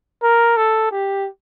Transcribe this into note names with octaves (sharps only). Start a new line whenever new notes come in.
A#4
A4
G4